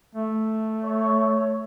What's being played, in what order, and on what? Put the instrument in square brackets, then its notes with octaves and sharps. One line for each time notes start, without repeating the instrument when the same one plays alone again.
[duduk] A3
[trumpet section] C#5